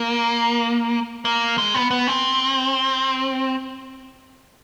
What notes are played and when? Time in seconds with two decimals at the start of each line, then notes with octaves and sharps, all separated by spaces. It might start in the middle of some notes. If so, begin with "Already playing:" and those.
Already playing: A#3
1.25 A#3
1.58 G#3
1.74 B3
1.91 B3
2.07 C4